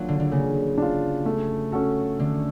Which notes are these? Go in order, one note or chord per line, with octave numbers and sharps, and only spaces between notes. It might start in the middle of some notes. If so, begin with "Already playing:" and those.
Already playing: F#3 A#3 D4 F4
D3
D3
C#3 A#3
D4 F4
A3
C#4 F#4 A4
D3 A3